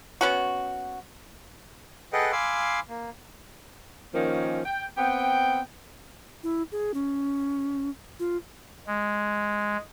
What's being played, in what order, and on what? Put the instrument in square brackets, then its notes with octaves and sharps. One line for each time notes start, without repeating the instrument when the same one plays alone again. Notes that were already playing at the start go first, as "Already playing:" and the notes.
[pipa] B3 C#4 F#4
[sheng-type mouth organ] G#4 A4 B4 D#5 F#5 G5
F5 G#5 B5 C6 D6 E6
A#3
[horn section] D#3 F3 A#3 C#4
G5
B3 C4 G5
[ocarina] E4
G#4
C#4
F4
[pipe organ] G#3